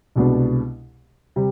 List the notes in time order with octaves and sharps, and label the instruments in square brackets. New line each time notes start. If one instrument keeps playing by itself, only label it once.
[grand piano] C2 B2 G#3 B3 D4
C3 G3